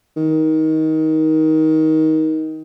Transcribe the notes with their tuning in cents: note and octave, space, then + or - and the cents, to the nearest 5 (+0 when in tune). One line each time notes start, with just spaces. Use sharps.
D#3 +20